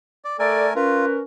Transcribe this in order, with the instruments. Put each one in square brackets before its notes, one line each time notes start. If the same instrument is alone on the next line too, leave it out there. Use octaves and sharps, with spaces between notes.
[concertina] D5
[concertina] A3 A#4 G#5 [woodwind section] A4 D5
[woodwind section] C#4 A#4 B4 [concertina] F4